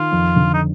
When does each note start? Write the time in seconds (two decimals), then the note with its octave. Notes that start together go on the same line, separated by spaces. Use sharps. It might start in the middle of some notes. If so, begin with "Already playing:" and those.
Already playing: D#3 F4
0.12 F2
0.36 D3
0.54 D#4